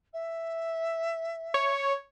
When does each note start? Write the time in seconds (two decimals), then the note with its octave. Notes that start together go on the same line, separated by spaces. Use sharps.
0.13 E5
1.54 C#5